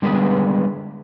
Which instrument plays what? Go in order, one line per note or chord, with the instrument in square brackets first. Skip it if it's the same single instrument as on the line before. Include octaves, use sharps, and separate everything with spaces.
[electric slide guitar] D3 G3 G#3 B3 G#4 B4